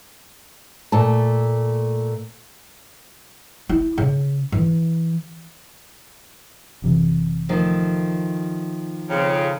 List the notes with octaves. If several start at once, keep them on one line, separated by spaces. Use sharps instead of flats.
A#2 A3 A5
E4
C#3
E3
F#1 C3 E3
D#3 F3 A3
F2 C#3